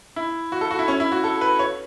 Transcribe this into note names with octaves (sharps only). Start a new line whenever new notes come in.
E4
F#4
A4
F#4
E4
C#4
E4
F#4
A4
B4
C#5